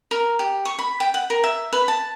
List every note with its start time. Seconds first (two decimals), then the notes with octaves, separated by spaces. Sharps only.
0.11 A#4
0.39 G4
0.65 C#6
0.79 B5
1.00 G5
1.14 F#5
1.30 A#4
1.44 E5
1.73 B4
1.88 A5